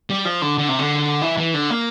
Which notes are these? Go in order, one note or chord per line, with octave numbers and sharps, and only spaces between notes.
G3
F3
D3
D3
C3
D3
E3
E3
D3
A#3